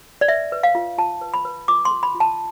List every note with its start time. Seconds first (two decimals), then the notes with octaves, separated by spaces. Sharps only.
0.21 D5
0.28 B4 E5
0.52 B4
0.63 F5
0.75 F4
0.98 F4 A5
1.21 B4
1.34 B5
1.45 B4
1.68 F4 D6
1.85 C6
1.91 A4
2.03 B5
2.15 F4
2.20 A5